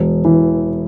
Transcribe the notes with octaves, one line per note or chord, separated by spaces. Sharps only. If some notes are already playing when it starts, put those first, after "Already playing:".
Already playing: E1
E3